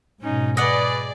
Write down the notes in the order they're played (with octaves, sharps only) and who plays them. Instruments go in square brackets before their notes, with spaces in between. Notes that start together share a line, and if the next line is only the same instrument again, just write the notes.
[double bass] G#2 B2 [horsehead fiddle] C#4 D#4
[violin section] G#4 D5 [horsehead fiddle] B4 [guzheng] D#5 F#5